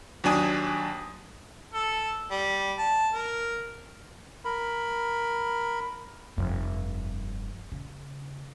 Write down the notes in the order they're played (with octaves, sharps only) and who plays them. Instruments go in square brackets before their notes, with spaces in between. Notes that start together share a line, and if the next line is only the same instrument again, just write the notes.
[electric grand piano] D#2 F#3 D4 G#5 D#6
[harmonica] A4
G3
A5
A#4
[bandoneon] A#4 B5
[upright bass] F1 G2
C#3